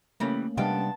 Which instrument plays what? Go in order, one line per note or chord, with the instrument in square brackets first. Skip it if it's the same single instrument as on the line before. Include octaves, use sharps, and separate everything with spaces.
[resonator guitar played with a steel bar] C#3 E3 G3 [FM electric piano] A3 A#3 C#4
[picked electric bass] C3 G3 D4 [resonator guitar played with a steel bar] G#3 F5 G5 [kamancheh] B3 A5